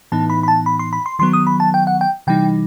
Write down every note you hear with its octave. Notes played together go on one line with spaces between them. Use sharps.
A2 E3 B3 D#4 A5
B5
B5
A5
B5
C6
B5
C6
D#3 F#3 B3 C6
D#6
B5
A5
G5
F#5
G5
C3 E3 G3 D#4 G5